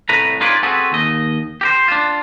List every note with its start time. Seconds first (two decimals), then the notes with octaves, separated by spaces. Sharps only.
0.09 C2 A2 A3 B4 A#5
0.41 D#4 F4 G#4 B4 C#5 D5
0.63 C4 F#4 G#4 A4 B4
0.92 D#2 D#5
1.61 G4 A#4 C5
1.88 D4 F4